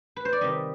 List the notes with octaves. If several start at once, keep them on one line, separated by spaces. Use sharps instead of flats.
B4
C5
D5
C3 D#3 G3 D#5